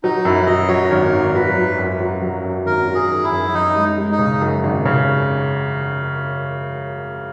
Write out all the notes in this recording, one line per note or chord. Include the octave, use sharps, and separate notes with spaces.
F#3 D#4
F#2 E4
F#3 D#5
F#3 C#5
G#1 A#4
G#1
F#3 B4
F#3
F#2
F#3
F#3
F#2
G#1 A#4
F#3
G#4
D#3
E4
F#2
F#2 D#4
G#3
G#3
D#4
C#3
F#2
G#1
C#3